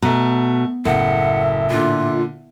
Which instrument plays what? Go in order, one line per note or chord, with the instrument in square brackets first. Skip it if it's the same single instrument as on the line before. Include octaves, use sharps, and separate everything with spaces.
[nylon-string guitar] B2 [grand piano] A3 A#5
[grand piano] F#1 [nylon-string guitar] A2 [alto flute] E5 [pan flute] F#5
[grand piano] A#2 D3 [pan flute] F4